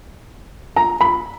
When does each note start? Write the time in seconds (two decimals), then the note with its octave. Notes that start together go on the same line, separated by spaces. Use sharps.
0.76 A#5
1.01 B5